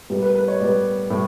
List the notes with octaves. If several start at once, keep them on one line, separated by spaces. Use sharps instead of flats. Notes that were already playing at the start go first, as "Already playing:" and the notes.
A2 G3 B3
B4
B4
C#5
A2 G3 B3 D5
A2 G3